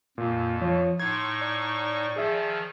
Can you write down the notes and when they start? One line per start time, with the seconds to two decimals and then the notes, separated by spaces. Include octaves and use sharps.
0.18 F2 A#2
0.61 F3 C#5
1.00 A2 D#4 C6 C#6 G#6
1.41 D5
2.16 D#3 F3 G#4 E5